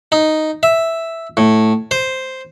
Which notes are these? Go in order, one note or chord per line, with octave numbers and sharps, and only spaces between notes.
D#4
E5
A2
C5